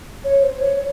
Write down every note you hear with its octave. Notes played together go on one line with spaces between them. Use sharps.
C#5
C5
C#5